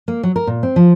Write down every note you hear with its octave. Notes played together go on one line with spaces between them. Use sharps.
A#3
F#3
A#4
A#2
C4
F3